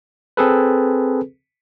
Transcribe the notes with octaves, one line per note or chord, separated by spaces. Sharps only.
C4 G#4 A4 B4